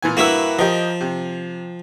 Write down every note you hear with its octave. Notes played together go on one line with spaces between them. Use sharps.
A#2 E3 G#5
G2 A#3 E4 F#4 B4 E6
F3 G4 A#4 D#5
C3